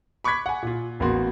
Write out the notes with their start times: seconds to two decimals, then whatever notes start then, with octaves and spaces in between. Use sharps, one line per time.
0.24 B5 C#6 D6 F#6 G#6 B6
0.46 F#5 G#5
0.62 A#2 F4
1.00 A1 A#3 B3 F#4 C6